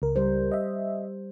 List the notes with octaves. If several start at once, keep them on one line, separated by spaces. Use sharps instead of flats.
C#2 A#4
G3 C5
D#5 E5